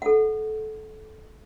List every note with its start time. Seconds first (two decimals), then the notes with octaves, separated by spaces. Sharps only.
0.02 A4 F#5